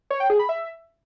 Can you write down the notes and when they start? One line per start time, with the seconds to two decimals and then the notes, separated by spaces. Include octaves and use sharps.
0.10 C#5
0.20 G5
0.30 G#4
0.39 B5
0.49 E5